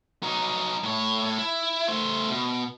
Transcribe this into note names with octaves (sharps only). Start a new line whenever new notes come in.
F#3 D#4
A2 C#5
E4
A3 C5
B2